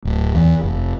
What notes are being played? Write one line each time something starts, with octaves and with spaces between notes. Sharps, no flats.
D1
E2
F1